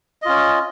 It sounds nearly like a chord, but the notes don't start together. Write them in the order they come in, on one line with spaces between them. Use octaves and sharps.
D#5 F4 C#4